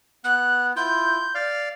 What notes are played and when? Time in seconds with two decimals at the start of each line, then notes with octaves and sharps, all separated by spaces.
0.24 B3 F#6
0.76 E4 F4 G6
1.35 D5 F5 F6